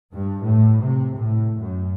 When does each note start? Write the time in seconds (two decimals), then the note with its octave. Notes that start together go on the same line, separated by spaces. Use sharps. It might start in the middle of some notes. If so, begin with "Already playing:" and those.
0.14 G2
0.44 A2
0.83 C3
1.16 A2
1.59 F#2